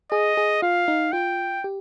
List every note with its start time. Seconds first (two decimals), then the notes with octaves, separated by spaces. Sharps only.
0.12 G#4 D#5
0.37 G#4
0.62 F4 F5
0.88 D#4
1.13 F4 G5
1.64 G4